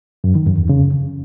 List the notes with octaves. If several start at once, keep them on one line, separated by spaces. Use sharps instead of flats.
F#2
D#3
F#2
E2
C#3